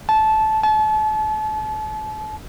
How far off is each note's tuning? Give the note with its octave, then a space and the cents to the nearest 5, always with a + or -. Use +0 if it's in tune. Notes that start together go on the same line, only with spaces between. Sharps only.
A5 -15
A5 -35